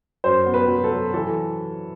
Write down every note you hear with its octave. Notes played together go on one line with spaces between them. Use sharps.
F#2 C5
B3
B4
F#3
A4
F#3
E3 A4